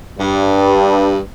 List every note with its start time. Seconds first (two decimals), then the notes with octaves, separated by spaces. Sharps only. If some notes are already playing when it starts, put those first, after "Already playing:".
0.19 G2